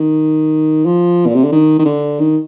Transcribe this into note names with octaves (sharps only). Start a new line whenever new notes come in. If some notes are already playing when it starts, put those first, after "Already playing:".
Already playing: D#3
F3
A#2
C3
D3
D#3
D#3
D3
D#3